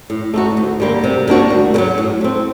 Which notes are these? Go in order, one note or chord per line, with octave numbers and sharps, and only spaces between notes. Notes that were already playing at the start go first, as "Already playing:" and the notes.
A2
A3 D#4 F#4
D2
D3 G3 A#3
C3
G3 A#3 D4 F#4
D2
D3
F#3
A2
A3 C4